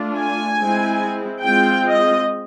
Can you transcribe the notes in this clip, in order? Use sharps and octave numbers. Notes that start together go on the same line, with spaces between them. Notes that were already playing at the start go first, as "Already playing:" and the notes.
Already playing: A3 D4 F4
G#5
G#3 C4 E4
G#3 C4 F4 G5
D#5